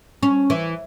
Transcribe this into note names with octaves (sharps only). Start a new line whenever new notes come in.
C#4
E3